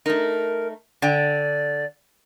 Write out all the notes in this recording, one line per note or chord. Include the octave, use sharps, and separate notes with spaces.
A3 D#4 A#4
D3 D5 G5